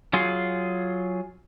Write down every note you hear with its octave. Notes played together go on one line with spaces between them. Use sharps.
F#3 F4 G#4